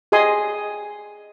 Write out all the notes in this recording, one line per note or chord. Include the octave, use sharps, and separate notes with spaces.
G4 G#4 D#5 G#5 C6 D#6